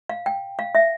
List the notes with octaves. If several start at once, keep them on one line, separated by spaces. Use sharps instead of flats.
F5
G5
F5
E5